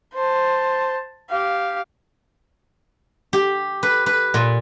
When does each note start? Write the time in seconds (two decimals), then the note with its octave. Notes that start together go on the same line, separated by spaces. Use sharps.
0.14 C5 A5
1.29 G4 F5
3.33 G4
3.83 B4
4.06 B4
4.34 A#2